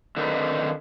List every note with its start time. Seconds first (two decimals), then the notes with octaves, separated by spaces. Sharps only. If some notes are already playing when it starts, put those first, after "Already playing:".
0.17 D3 D#3 C4 D#4 B4